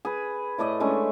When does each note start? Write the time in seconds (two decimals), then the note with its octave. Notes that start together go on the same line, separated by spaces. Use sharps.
0.05 G#4 B4
0.58 A2 A3 D5 D#5
0.80 G#3 A3 C#4 D4